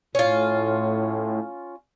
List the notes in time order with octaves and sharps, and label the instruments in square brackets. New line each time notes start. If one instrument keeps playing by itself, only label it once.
[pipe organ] A2 [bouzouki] C#4 F4